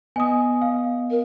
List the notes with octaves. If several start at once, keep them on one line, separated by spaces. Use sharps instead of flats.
B3 D#5 G#5 D#6
F5
A#4